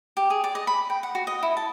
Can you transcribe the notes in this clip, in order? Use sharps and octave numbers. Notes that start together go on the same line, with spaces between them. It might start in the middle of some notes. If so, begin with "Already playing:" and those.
G4
G#4
D5
D#5
B5
G5
F#5
F#4
D#5
E4
A5